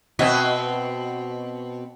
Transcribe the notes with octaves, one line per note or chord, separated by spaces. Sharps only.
B2 C4 F#4 D#5 E5